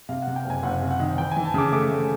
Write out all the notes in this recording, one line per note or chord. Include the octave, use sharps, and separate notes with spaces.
C3 F5
F#5
C3
G5
F#1 G#5
F#1 F#5
C3
F#5
D#3
E3 G5
G#5
E3
A5
C#3 D6
A3 D6
A3